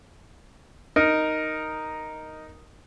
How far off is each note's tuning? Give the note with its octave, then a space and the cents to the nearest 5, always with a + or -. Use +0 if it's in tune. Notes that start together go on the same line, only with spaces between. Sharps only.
D#4 +0 A#4 +0